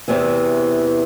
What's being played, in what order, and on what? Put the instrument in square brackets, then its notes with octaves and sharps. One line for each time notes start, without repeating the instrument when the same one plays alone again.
[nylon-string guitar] E2 C3 E3